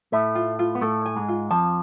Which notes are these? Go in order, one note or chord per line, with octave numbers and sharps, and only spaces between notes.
A2 A3 E5
F4
F4
B3
A2 A3 A4
G#5
G#2 G#3
F4
F2 F3 A5